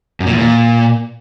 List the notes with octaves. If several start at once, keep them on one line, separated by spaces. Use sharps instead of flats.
F#2
A#2
E2
A#2